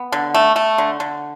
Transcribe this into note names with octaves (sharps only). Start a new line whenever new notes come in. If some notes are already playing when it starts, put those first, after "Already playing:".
Already playing: B3
D3
A3
A3
D3
D3